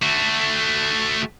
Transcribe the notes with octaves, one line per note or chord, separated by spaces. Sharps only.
A3 F#4